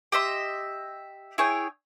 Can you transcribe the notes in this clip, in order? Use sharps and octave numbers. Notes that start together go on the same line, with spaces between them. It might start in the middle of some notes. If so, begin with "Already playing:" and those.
G4 D#5 E5 C6
E4 G#4 C#5 G5